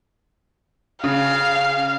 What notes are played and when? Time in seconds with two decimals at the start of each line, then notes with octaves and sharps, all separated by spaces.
1.04 C#3 F5